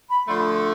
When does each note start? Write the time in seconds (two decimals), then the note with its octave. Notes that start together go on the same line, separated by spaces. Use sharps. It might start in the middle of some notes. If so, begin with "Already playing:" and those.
0.09 B5
0.28 D3 F3 A3 C6